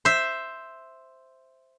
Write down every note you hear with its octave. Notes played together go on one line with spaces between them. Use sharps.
C5 E5